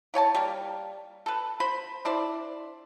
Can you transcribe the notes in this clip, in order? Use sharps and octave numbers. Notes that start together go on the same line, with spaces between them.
E4 C#5 G#5 A5
G3 A#3
A4 B4
C5 B5
D4 E4 C5 D5